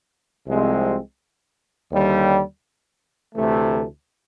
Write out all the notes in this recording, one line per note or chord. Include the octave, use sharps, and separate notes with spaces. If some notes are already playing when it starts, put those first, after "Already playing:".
C2 C3 F3 G#3 C4
D#2 D3 G3
D2 C3 E3 A3